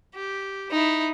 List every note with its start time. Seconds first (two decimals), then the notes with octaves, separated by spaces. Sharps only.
0.15 G4
0.71 D#4 E4